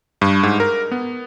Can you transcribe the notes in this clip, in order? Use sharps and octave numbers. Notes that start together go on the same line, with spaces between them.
G2
G#2
A#4
B3